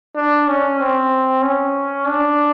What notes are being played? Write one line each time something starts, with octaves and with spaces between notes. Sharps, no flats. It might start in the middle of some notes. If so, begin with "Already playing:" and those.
D4
C#4
C4
C#4
D4